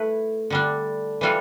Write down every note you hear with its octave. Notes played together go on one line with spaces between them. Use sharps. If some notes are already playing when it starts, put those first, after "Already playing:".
Already playing: A3 E4 B4
D3 G3 D4
E3 G3 D4 F4 A4